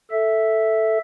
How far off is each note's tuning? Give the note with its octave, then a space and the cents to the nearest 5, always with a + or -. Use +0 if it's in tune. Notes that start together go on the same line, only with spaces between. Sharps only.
A4 +0 E5 -5